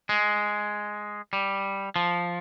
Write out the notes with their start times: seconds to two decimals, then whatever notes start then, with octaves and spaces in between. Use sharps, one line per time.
0.09 G#3
1.33 G3
1.96 F3